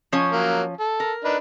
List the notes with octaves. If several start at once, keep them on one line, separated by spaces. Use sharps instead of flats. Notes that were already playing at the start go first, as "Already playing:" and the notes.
F3 C#4 C#5
F#3 A#3
A4
A#4
D4 D#4 B4